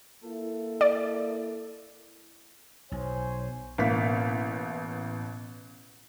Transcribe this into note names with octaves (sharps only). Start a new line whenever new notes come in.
A#3 E4 A4
D5
B1 C5 C#5 G#5
A1 B2 A#3 F5 B6